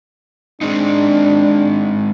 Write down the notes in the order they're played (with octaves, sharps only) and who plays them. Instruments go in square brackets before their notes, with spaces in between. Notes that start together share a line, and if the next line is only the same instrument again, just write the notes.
[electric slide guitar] G#3 C4 D#4 [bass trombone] D4